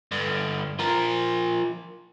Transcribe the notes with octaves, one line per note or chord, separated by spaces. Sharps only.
G2 D3
F3 A#4